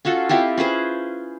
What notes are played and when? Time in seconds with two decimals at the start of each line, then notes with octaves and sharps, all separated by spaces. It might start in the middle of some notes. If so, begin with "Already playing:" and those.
0.05 C#4 F4 F#4 A4
0.29 C4 E4 F4 G4
0.57 C#4 G#4 B4 C5